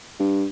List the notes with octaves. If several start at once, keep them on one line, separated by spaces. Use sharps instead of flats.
G2